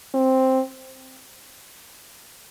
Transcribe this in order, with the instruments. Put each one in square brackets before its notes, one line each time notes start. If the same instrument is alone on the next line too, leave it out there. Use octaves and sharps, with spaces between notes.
[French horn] C4